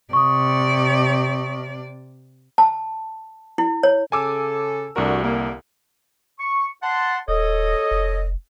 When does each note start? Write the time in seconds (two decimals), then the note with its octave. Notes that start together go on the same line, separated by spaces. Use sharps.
0.13 C3 D5 C#6 D#6
2.58 A5
3.58 E4
3.83 C#5
4.12 C#3 A4 G#5 D6 E6
4.96 C2 A3 D4 F#4 A#4
5.23 D3 G3 A#3
6.40 C#6
6.83 F#5 A5 C6
7.28 D#1 A4 C#5 D#5
7.91 F1